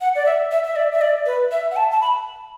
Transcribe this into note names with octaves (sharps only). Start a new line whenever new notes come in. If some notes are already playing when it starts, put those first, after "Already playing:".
F#5
D5
E5
E5
E5
D5
E5
D5
B4
E5
F#5
A5
A5
B5